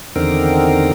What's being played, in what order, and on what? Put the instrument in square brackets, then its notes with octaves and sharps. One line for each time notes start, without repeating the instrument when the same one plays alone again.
[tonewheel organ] E2 D3 D#3 C4 A#4